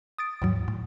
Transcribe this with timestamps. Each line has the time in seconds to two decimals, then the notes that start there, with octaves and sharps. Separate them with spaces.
0.18 D#6 A6 D7
0.42 D#2 G#2 F#3
0.68 A2